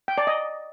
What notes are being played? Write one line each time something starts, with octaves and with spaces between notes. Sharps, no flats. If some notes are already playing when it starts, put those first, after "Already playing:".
G5
D5
D#5